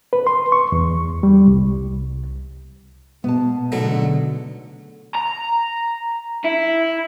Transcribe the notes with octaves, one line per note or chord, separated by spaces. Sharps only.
B4
C6
C#6
E2
G3
C2
B2 B3 A5
G#2 B2 D3 F#3 A3
A#5
E4